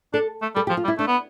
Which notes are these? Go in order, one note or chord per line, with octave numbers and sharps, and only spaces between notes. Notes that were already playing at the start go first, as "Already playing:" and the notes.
D4 A4
A3
G3 A4
G4
F3
F4
G3
E4
A3 D4
B3